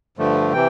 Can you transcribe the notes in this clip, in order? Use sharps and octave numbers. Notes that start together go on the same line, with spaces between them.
G2 D3 F3 A3
C3 E3 G5